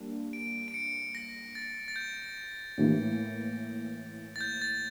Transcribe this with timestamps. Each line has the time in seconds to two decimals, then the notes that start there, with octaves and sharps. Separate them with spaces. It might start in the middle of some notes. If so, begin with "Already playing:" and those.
Already playing: G3 A#3 D4
0.33 D7
0.68 D7
0.74 C#7
1.15 A#6
1.55 A6
1.88 A6
1.96 G6
2.78 A2 E3 A#3 E4
4.36 A6
4.41 G6
4.62 A6